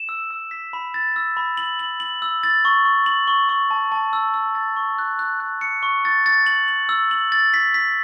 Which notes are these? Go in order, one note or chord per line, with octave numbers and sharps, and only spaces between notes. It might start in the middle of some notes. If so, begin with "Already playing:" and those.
Already playing: E7
E6
E6
B6
B5
A6
E6
B5
F#7
F#7
F#7
E6
A6
C#6
C#6
F#7
C#6
C#6
A5
A5
E6
E6
A6
C#6
F#6
F#6
F#6
C#7
C#6
A6
A6
F#7
F#7
E6
F#7
A6
B6
B6